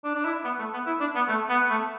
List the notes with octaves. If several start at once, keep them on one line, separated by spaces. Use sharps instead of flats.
D4
D4
E4
B3
A3
B3
E4
D4
B3
A3
B3
A3